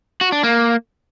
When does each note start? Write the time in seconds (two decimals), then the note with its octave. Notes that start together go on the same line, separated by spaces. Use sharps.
0.21 F#4
0.32 D4
0.43 A#3